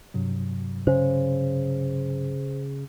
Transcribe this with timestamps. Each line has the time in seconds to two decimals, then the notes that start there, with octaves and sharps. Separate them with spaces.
0.14 G2 C3 F#3
0.87 C#3 C5